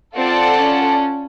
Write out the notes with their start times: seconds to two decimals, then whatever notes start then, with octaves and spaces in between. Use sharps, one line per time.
0.16 C4 F4 A4 D5 F#5 A5
0.58 C#4